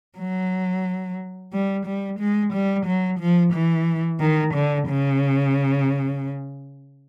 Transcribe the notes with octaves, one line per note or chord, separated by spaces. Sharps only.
F#3
G3
G3
G#3
G3
F#3
F3
E3
D#3
D3
C#3